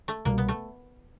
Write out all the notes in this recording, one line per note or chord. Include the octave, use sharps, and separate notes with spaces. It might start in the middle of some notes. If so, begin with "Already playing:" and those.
A3
C2 B2 G3 A#3
B3
A3